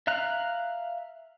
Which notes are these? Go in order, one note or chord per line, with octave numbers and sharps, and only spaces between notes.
E5 F5 A#5 F#6